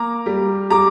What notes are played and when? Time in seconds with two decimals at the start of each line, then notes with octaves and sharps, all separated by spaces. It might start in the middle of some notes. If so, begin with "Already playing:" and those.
Already playing: A#3 A#5 D6
0.26 G3
0.70 G3 A#5 D6